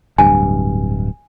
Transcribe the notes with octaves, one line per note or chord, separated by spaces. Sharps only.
D1 G2 G#5